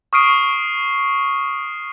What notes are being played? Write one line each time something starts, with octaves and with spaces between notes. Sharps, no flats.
C#6 D#6 F6 C7 D7 D#7